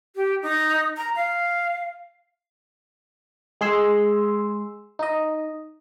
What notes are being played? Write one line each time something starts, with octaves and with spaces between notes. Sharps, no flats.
G4
D#4
A#5
F5
G#3 G#4 C6 E6
D#4 D#5